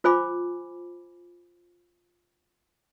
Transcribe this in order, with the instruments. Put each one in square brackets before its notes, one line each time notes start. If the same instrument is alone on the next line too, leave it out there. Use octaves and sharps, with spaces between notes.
[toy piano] F4 C5 G#5 B5 D6